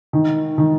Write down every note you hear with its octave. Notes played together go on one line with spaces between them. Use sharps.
D#3
D#3